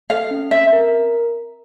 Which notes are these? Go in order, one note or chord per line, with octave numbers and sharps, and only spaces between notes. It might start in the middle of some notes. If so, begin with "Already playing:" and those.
A4 F5
C#4
C4 E5
A#4